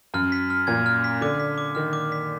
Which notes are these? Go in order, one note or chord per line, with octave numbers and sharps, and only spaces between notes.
F#2 F6
B6
F6
A#2 G#6
F6
B6
D3 D6
B6
D6
D#3 F6
D6
B6